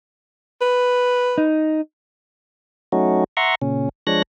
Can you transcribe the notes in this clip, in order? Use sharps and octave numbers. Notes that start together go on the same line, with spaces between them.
B4
D#4
F#3 A3 C#4 D#4 F#4
E5 F#5 A#5 C6 C#6
A#2 C#3 C#4
F3 G#3 D4 C#5 F#6 A#6